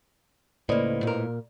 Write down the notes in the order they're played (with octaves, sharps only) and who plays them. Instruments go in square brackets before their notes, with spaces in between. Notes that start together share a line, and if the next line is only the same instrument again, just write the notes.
[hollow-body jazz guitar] C#2 A#3 [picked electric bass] A2 [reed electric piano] B4 C5 D#5 [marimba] D5
[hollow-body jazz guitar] A#2 A#4